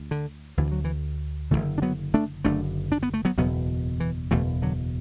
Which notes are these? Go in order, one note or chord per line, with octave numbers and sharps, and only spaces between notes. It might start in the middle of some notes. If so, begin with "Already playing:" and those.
Already playing: D2
D3
D2 D3 E3
F#3
E3
F#2 D3 E3 A3
F#1
D4
F#3 B3
A3 D4
F#1 F#2 D3 A3 D4
D4
B3
A3
F#3 B3
F#1 E2 B2 F#3 B3
E3
F#1 E2 B2 E3 A3
D3 F#3